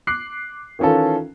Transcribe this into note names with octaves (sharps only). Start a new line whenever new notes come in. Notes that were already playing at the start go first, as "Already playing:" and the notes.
D6 F#6 C7
D#3 E3 C#4 F4 A4